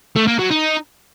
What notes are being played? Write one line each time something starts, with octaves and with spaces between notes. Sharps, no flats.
A3
A#3
F#3
D#4